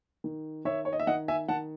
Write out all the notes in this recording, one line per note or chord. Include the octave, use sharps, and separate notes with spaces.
D#3
D#3 C#5 E5
C#5
D#5
E5
D#3 D#5 F#5
E5 G#5
D#3 F#5 A5